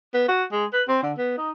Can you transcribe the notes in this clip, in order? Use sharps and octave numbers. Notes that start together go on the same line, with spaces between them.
B3
F#4
G#3
B4
C4
D3
B3
D#4